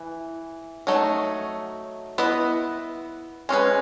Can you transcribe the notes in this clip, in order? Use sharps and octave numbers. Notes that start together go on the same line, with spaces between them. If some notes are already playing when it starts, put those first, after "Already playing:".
Already playing: E3
F#3 A3 D#4
B3 E4 B4 D#5
G#3 C#4 G#4 B4